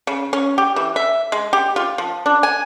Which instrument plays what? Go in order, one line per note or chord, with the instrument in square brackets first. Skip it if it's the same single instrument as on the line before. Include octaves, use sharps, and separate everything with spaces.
[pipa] C#3
C#4
G4
E3
E5
G#3
G4
F4
F3
D4
G#5